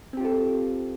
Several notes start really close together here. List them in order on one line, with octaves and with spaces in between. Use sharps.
C4 G4 F4 A4